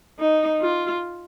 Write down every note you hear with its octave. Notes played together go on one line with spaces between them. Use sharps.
D#4
F4